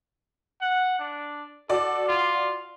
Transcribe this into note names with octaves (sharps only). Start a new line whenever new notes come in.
F#5
D4
F#4 A4 D5 D6
F4